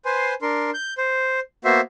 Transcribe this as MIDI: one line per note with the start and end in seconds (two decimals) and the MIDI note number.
0.05 0.34 71
0.05 0.34 72
0.05 0.34 80
0.05 0.34 84
0.42 0.70 62
0.42 0.70 70
0.42 0.70 84
0.74 0.94 91
0.98 1.40 72
1.65 1.81 58
1.65 1.81 59
1.65 1.81 66
1.65 1.81 72
1.65 1.81 76
1.65 1.81 84